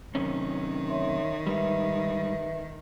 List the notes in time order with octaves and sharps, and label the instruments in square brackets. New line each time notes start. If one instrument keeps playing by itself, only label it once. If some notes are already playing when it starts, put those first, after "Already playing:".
[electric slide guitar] F#2 C3 C#4 [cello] D#3
[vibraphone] C#5 E5 C6
[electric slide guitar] G#2 G3 [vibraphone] B4 E5